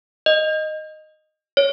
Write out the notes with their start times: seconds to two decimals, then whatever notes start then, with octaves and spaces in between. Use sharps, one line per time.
0.26 D#5
1.57 C#5